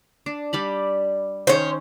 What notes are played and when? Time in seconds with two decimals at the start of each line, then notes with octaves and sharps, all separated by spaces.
0.26 D4
0.53 G3 D5 B5
1.47 D#3 C#4 C5 C#5